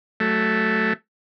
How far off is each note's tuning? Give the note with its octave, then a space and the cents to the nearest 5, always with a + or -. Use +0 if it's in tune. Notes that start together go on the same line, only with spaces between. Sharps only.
F#3 +15 A3 +0